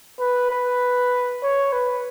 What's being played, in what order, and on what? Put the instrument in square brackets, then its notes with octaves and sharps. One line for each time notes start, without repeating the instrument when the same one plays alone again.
[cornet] B4
B4
C#5
B4